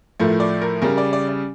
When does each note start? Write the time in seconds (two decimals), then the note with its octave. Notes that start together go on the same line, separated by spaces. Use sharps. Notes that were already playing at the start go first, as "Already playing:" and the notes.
0.20 A2 F3 A3 A#4
0.40 D5
0.62 A#4
0.82 C#3 G3 A#4
0.98 D5
1.13 D5
1.29 D5